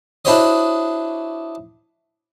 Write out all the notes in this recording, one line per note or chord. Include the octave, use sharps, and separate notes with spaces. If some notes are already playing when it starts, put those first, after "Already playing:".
D4 E4 F#4 C5 C#5 D#5